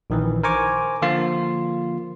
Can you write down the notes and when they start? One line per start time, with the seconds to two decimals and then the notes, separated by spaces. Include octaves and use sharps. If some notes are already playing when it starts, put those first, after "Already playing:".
0.10 A#1 D#3 E3
0.43 A#4 C5 G#5 A#5 C#6 D6
1.02 D3 F3 A#3 F4 C7